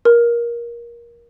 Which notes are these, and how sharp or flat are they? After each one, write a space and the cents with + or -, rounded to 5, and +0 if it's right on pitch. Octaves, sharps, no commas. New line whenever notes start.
A#4 +20